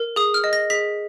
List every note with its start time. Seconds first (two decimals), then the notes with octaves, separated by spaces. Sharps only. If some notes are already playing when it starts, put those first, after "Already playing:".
Already playing: A#4
0.16 G#4 D#6
0.34 F6
0.44 D#5
0.53 A#6
0.70 G#4 B6